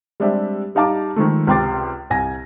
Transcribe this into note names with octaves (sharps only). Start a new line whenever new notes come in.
G3 G#3 C4 D4 G4 E5
G3 D#4 F5 A5 D6
D#3 F3 G#3 A3
C#2 C3 G5 C6 D6 A6
C2 G#5 A#6